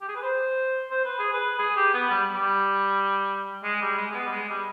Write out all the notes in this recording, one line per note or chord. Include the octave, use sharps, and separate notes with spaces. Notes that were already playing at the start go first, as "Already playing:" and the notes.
G4
G#4
B4
C5
C5
B4
G#4
B4
G#4
G4
B3
G3
G3
G#3
G3
G#3
G#3
B3
G3
G#3
G3